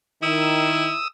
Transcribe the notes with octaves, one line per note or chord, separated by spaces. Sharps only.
D#3 E4 D#6 E6